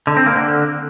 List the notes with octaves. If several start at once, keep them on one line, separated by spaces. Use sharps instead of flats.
D3
C4
A#3
D3